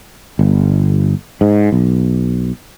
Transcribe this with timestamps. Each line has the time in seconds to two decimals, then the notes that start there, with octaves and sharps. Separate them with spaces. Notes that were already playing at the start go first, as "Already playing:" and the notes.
0.39 G1
1.41 G#2
1.72 B1